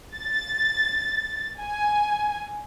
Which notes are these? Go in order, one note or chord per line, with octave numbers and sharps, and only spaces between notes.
A6
G#5